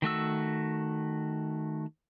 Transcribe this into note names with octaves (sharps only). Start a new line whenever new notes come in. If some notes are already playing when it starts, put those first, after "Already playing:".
D#3 A3 F#4 E6